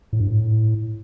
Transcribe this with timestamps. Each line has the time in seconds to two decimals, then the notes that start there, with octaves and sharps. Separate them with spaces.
0.13 A2
0.20 G2
0.27 A2